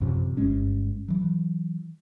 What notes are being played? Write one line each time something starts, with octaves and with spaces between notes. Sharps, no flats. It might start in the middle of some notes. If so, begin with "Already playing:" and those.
A1 F#2 C3 F3
G1 G2 G#3 C#4
E3 F#3